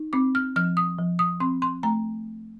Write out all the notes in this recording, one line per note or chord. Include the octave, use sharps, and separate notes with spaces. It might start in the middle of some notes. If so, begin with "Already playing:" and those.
Already playing: D#4
C4 D6
F6
F3 F6
D#6
F3
D#6
C4 C6
C6
A3 A#5